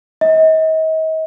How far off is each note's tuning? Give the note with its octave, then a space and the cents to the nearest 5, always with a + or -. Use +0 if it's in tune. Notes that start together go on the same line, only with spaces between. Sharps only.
D#5 +40